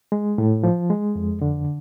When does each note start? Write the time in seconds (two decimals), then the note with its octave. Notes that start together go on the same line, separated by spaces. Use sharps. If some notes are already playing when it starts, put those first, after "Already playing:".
0.12 G#3
0.38 A2
0.63 F3
0.90 G#3
1.15 F2
1.41 D3